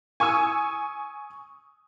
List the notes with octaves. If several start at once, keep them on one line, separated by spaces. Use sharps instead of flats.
G#5 C#6 D#6 E6